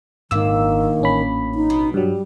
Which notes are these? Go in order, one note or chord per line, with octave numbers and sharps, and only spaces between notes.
G#1 D2 A#2 D#3 A#3 E6
A1 C#4 B5
D#4
B2
G2 F#3 G3